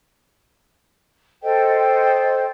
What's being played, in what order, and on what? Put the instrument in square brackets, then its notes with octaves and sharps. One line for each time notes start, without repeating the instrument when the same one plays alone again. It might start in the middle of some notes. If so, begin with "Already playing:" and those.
[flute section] A4 C5 D#5 G5